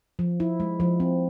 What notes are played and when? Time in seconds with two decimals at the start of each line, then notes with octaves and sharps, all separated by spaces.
0.19 F3
0.40 E4
0.60 G#3
0.80 F3
1.00 C4